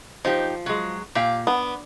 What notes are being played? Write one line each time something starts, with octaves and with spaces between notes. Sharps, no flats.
F3 D#4 G4
F#3 G#3
A#2 G4 F5
B3 D4